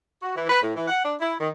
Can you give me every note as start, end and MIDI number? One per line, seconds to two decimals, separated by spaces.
0.23 0.33 66
0.35 0.46 52
0.50 0.60 71
0.62 0.72 45
0.76 0.88 52
0.88 1.04 78
1.05 1.15 62
1.21 1.35 64
1.41 1.49 51